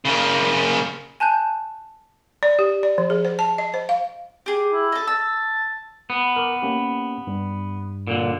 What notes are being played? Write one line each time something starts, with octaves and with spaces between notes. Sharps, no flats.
C#3 A#3
G#5 A5 F#6 G6
D5
G4
D5
F3
G#4
C5
A5
D#5
C5
F5
G4 G#4
E4
A4 D#5
A5 E6
B3
A#4 D6
A#3 C#4 G4
G2
A#2 D3